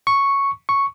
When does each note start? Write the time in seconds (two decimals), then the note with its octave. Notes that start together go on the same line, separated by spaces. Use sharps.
0.07 C#6
0.69 C#6